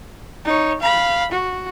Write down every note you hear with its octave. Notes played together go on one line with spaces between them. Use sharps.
D#4 C#5
F5 B5
F#4